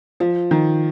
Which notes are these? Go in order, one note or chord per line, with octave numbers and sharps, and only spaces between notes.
F3
D#3